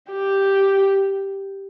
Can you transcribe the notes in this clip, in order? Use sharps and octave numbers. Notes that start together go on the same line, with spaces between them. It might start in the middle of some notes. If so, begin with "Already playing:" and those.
G4